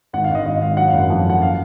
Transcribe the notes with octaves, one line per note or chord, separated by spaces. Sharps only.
G#1 F#5
G#1 F5
D#5
G#1 D#5
G#1 F5
F#3 F#5
F#1 F5
F#5
F2
F#1 F#5
F5